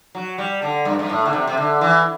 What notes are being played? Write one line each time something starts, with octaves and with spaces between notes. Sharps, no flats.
F#3
G3
D3
G2
G2
A2
D3
C3
C3
D3
E3